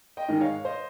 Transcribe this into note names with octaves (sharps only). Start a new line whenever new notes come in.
D#5 G5
G#2 D#3 G#3
C#5 F5
C5 D#5